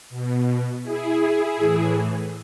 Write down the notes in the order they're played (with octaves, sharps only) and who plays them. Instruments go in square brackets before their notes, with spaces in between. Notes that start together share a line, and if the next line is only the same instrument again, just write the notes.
[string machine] B2
E4 G#4
A2 E3